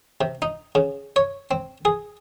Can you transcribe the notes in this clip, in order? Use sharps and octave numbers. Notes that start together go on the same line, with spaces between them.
C3
D#4
C#3
C#5
C4
G#4